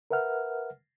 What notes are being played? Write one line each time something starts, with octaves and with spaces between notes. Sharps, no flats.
A#4 B4 E5 F#5 F6